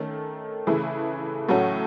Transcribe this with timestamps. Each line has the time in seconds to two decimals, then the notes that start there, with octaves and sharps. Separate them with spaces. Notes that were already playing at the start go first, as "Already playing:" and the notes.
Already playing: D#3 A3 C#4
0.67 C#3 E3 A3 E4 G#4
1.49 A2 F#3 A3 C#4 F#4